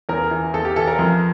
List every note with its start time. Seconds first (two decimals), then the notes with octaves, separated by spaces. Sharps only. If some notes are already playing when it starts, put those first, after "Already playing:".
0.09 E2 A#4
0.31 E3
0.54 E2 A4
0.65 G4
0.76 E3 A4
0.88 A#4
0.99 F2